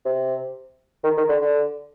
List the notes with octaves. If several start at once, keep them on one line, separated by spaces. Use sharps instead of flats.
C3
D#3
D#3
D3
D3